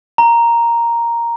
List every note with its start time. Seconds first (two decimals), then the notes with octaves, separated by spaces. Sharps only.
0.18 A#5